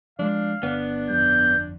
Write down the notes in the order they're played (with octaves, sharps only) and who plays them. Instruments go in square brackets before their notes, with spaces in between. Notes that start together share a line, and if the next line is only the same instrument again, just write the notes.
[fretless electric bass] F3 G#3 [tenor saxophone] D4 [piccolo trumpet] F5
[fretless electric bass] G1 [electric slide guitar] B3 [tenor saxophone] D4
[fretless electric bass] G1 F2 G3 [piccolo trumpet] G6